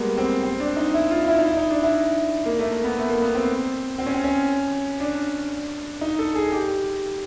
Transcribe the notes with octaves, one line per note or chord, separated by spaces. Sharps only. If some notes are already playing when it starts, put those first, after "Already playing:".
Already playing: G3 G#3 A#3 B3
C4
C4
D4
D#4
E4
F4
E4
D#4
E4
D#4
D4
E4
A#3
A3
A#3
B3
A3
A#3
B3
C4
C4
C#4
C4
C#4
D4
D#4
A4
G#4
G4